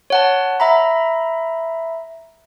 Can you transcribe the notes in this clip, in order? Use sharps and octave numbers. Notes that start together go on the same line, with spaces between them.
C#5 F#5 A5
E5 A#5 B5